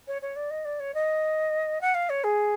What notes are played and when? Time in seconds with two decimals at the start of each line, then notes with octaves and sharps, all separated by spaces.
0.08 C#5
0.22 C#5
0.36 D5
0.50 D#5
0.65 D5
0.80 C#5
0.94 D#5
1.81 F#5
1.95 F5
2.10 C#5
2.24 G#4